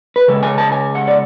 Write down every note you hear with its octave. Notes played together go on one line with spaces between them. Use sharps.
B4
C#3 G#3 A4
G#5
A5
G#5
F#5
D5